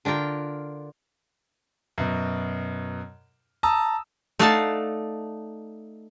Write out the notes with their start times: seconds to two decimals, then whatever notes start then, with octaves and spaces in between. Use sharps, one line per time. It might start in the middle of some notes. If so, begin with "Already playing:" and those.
0.05 D3 D4 F4 A#4 G5
1.98 F#2 B2
3.63 A5 A#5 D#6 E6
4.39 A3 D#4 D5 F5 F#5 A5